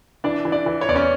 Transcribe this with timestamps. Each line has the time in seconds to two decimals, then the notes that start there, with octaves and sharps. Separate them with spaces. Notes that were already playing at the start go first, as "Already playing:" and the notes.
0.24 E3 D4 D5
0.45 E3
0.52 D4 D5
0.66 E3
0.81 C#5
0.88 E2 D5
0.96 C#4 C#5